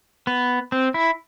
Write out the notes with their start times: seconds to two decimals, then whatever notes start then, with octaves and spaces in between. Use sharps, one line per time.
0.27 B3
0.72 C4
0.94 E4